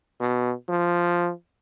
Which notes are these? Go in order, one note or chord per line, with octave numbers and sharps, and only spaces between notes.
B2
F3